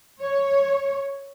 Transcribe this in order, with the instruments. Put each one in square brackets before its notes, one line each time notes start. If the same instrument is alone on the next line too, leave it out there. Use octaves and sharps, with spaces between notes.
[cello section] C#5